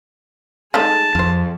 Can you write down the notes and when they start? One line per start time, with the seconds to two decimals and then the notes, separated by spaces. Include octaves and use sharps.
0.74 G#3 A3 D#4 G#4 A5
1.15 F2 F4 C5